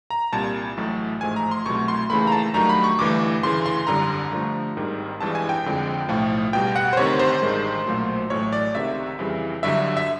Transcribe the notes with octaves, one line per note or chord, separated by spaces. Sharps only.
A#5
C2 A#2 G3 A5
A1 A2 F#3 A3
A1 G#2 F3 A3 G#5
A#5
C6
C2 B2 F#3 A3 C#6
C6
D#2 C#3 E3 A3 B5
A#5
A5
G2 D#3 F#3 A3 A#5
B5
C#6
G1 G2 E3 A3 D6
D2 C#3 E3 C6
C6
G#1 F#2 D3 G3 A#5
G2 D3 F3 A3
G#1 G#2 D#3 G3
G#1 G2 E3 G#3 A5
G#5
G5
G1 F2 D3 F3 G#3
B1 A2 F3 A3
C#2 B2 G3 G5
F#5
C5
D2 C3 D#3 C#5
C5
A1 G2 D#3 G#3
B1 A#2 F#3 A3
A1 A2 F#3 A3 C#5
D5
C#2 C3 D#3 E5
F2 C#3 E3 G3
G1 G2 D3 F#3 E5
E5